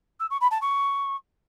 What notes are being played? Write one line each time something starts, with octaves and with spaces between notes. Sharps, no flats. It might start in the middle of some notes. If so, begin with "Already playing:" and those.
E6
C#6
B5
A5
C#6